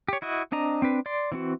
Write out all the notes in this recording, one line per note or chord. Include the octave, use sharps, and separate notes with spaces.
G4 C#5
E4 F#4 D#5
C4 D4 D#5 A#5
C4 D4 B4
D5 C6
E3 C4 F#4